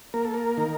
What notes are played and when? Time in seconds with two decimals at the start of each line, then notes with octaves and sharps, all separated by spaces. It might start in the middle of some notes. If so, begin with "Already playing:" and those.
0.14 A#3 A#4
0.25 A4
0.34 A#4
0.57 D#3